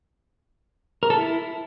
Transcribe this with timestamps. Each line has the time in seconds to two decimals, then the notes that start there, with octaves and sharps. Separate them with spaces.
1.03 A#4
1.10 A4
1.18 E4